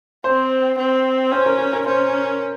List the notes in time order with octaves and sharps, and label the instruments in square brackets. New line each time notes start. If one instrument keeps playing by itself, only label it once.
[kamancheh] C4 [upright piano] C5
[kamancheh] C4
[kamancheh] C#4 [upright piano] C5
[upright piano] A#4
A#4
A#4
[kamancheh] C#4 [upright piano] C5